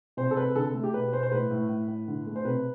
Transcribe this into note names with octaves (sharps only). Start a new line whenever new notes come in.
C3 C5
A4
C3 B4
D3 A4
A3
G4
B2 B4
B2 C5
C5
A2 B4
A2
A2
A2
D3
A3
C5
C3 B4